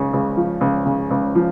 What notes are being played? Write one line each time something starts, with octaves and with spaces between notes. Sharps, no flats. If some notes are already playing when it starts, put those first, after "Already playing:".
Already playing: C#2 C#3
C#2
F3
C#2
C#3
C#2
F3